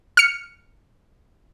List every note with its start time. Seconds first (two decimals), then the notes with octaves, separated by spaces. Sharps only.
0.17 F6 C#7